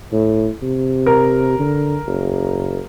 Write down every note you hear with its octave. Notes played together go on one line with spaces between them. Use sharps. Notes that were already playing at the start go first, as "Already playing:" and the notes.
A2
C3
A#4
D3
F#1